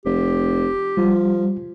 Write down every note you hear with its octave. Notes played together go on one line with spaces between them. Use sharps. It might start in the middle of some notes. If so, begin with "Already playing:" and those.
F1 G4
F3 G3